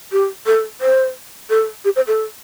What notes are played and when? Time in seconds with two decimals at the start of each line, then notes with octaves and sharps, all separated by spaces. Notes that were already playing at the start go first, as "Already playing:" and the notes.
0.12 G4
0.46 A4
0.81 C5
1.50 A4
1.85 G4
1.96 C5
2.07 A4